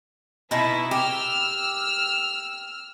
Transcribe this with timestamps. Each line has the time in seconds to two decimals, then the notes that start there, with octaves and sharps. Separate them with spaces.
0.51 B2 D#4 E4
0.91 G4 E6 F6